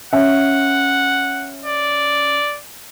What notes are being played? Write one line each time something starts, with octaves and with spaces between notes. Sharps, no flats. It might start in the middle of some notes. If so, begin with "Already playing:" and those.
C#4 E5 F#5
D5